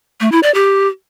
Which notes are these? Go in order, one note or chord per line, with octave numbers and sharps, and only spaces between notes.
A3
E4
D5
G4